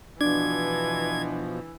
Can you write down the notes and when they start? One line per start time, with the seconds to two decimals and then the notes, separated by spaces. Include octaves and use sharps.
0.21 B2 E3 F3 D4 G#6